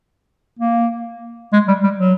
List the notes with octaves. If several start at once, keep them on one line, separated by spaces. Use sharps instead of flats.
A#3
G#3
G3
G3
F#3